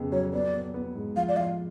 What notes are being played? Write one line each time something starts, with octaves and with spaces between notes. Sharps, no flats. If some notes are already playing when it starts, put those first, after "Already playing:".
Already playing: F2 C#3 B3
F#3 C#5
B3 D5
B3
B3
G#2
F3 F5
D5
F3 F5